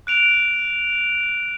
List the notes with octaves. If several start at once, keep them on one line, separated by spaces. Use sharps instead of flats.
F#6 D7 F7